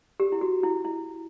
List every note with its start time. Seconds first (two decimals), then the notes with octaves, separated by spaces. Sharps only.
0.20 G4
0.32 E4
0.41 F#4
0.63 E4
0.85 E4